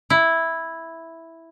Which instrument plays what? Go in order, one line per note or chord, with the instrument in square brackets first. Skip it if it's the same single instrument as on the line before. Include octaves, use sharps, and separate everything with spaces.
[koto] E4